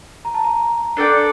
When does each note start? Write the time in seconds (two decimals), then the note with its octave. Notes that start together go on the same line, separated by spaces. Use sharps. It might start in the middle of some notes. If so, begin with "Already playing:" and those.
0.25 A#5
0.34 A5
0.44 A#5
0.97 D4 A4 D5 G5